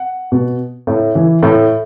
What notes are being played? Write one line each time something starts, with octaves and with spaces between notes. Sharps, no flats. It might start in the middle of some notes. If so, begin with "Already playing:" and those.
Already playing: F#5
B2
A2
E3
A2